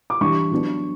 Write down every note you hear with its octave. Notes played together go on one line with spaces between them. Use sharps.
D6
E3 G3 D4 C#6
F#3 B3 D4